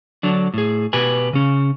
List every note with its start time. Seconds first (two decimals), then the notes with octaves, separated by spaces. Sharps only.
0.23 D3 F#3 D4
0.54 A2 G#4
0.93 B2 G4 B4 G#5
1.33 C#3 C#4